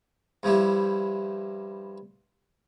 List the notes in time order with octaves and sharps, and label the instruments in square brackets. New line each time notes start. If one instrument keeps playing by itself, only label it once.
[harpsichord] G2 F3 G3 E4